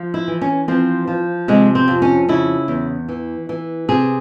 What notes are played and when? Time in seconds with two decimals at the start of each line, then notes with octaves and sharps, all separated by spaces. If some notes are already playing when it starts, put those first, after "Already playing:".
Already playing: F3
0.14 E4
0.28 E3
0.41 C#4
0.68 F3 C4
1.07 F3
1.48 C3 G#3
1.75 C4
1.88 F2
2.02 C#4
2.29 C#3 E4
2.68 E2
3.08 E3
3.49 E3
3.89 C3 G#4